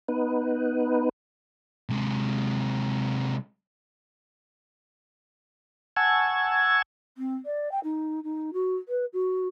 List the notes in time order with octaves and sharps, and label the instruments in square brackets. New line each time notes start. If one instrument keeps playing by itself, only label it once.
[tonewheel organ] B3 D#4 B4
[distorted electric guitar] C3 G#3
[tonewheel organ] F#5 G#5 A5 C#6 E6 G#6
[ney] C4
D5
G5
D#4
D#4
F#4
B4
F#4